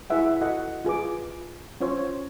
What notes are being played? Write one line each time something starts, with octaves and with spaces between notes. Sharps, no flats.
E4 G#4 B4 E5 F#5
F#4 A4 D#5 F#5
F4 G#4 B4 D6
C#4 F4 C5 C#5